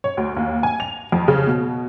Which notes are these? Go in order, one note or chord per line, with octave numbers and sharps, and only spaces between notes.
C#5
D2
D#2
G#5
F7
F2
C#3
B2